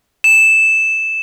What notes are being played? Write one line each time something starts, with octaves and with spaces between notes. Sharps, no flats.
E7